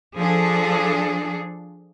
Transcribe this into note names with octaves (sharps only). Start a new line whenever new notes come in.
F3 D4 G#4 A4